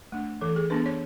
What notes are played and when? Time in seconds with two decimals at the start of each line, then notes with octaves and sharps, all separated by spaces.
0.12 A3 D4
0.41 E3 A4
0.56 G#4
0.70 B3 D4 B4
0.86 C#5